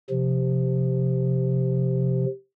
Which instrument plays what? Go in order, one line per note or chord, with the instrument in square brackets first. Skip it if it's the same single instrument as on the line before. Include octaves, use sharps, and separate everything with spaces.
[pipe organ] C3 F3